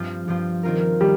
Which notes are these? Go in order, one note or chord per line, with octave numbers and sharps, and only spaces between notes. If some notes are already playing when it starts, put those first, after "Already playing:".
Already playing: G2 F3 C4 F4
G2 F3 C4 F4
D#3 C4 F4 A#4
D#3 G3